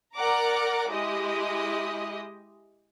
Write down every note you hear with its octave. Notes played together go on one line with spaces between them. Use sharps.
A#4 D5 F#5 A#5 D6
G#3 E4 G4 D#5